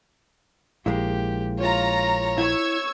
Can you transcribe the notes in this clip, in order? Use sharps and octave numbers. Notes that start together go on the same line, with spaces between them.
A#1 G#3 A#3 E4 G4
F4 C#5 A#5
E4 C#6 E6 G#6